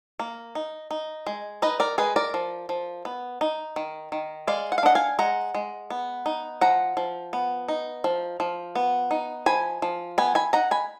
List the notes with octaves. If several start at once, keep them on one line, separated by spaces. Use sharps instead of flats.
A#3
D#4
D#4
G#3
D#4 B4 D#5
A#4 D5
G#3 G#4 B4
A#4 D5
F3
F3
B3
D#4
D#3
D#3
G#3 D5 F5
F#5
F5
D4 D#5 F#5
F5 G#5
G#3 F#5 A#5
G#3
B3
D#4
F3 F#5 A#5
F3
B3
D#4
F3
F3
B3
D#4
F3 G#5 B5
F3
B3 G#5 B5
G#5 B5
D#4 F#5 A#5
G#5 B5